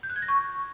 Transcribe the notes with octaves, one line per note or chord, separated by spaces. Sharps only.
G6
F#6
G#6
A#6
C#6